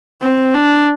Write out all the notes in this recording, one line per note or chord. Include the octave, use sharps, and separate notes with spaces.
C4
D4